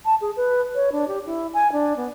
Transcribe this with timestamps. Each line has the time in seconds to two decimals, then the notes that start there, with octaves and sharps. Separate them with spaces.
0.05 A5
0.21 G#4
0.37 B4
0.75 C#5
0.92 D4
1.08 G4
1.26 E4
1.54 G#5
1.72 D4
1.97 B3